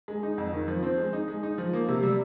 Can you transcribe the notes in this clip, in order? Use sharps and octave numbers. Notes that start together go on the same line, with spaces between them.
G#3
D#4
F2
D#3
F3
C4
G#3
D#4
G#3
D#4
F3
A#3
C3
G3